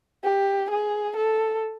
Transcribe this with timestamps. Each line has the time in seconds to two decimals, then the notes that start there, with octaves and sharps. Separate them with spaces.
0.24 G4
0.70 G#4
1.17 A4